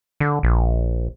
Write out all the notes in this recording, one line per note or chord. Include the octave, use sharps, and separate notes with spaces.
D3
A#1